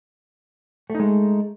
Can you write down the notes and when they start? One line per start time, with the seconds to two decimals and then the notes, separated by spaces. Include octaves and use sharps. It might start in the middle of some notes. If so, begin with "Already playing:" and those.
0.90 A3
0.95 D#4
1.00 G#3